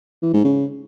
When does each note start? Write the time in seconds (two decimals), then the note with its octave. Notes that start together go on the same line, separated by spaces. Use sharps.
0.23 E3
0.34 G#2
0.44 C#3